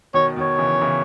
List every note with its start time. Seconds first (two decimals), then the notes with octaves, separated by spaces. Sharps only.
0.14 B2 D#3 C#5
0.36 B2 D#3 C#5
0.59 C#3 E3
0.81 C#3 E3